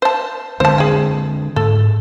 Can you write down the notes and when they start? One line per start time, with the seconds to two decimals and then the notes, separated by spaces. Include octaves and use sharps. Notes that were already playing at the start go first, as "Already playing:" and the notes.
0.02 C5 A5
0.60 D3 G#3 C4 C5 A5
0.78 G#4 G5
1.56 G#2 A4